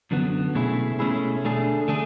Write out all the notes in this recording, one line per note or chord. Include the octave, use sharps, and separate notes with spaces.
F#2 D3 F#3 B3
B2 A3 C#4 E4 G#4
B2 A3 C#4 E4 G#4
D2 D3 A3 D4 G#4
D3 A3 D4 G#4